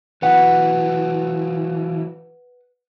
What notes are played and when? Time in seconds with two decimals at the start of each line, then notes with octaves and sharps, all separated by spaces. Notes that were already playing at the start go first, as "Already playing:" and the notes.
0.22 E3 F#3 B4 F#5